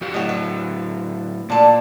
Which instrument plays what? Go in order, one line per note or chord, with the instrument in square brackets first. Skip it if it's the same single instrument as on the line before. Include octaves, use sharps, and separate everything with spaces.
[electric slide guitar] F2 F#4 G4
[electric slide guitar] A2 F#3 [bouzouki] F#4 G4 D#5
[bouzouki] B4
[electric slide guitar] A#2 [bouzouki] D4 A4